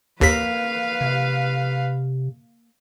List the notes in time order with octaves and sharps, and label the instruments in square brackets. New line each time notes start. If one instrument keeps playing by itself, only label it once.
[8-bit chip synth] D#2 B6 [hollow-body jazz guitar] A#3 [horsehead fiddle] B4 F5
[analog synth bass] C3